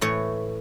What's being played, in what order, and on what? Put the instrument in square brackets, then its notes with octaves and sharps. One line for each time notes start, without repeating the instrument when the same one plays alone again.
[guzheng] A2 E3 A3 C#5